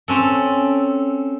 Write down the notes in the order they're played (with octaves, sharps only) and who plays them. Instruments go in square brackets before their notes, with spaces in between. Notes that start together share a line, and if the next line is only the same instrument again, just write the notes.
[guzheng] C4 C#4 A4